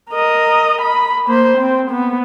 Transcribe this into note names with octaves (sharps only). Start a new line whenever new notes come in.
A#4 D#5
B5
A#3 C5
C4
B3